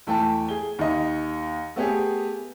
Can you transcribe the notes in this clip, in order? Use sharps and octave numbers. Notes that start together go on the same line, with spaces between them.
E2 A3 G5 A5
G#4 G7
D#2 D#5
A3 B3 G4 G#4